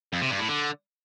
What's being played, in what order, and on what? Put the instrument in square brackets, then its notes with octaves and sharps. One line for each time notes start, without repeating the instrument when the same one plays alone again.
[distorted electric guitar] F2
C3
G2
A2
D3